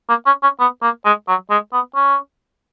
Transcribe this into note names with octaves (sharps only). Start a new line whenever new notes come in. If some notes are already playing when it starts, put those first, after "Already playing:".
A#3
C#4
C#4
B3
A#3
G#3
F#3
G#3
B3
C#4